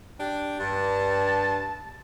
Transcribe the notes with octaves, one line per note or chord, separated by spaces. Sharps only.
D4 G4
G2 A5